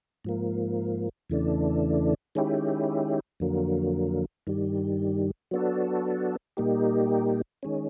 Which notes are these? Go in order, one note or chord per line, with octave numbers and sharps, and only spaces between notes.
G#2 F3 A#3
E2 C#3 E3 A3 D4
D#3 G#3 C#4 E4 G4
F2 D3 F#3 A#3
G2 D#3 G3
F#3 B3 D4 F#4 A4
A#2 G3 A#3 D#4 G4
D#3 G#3 C#4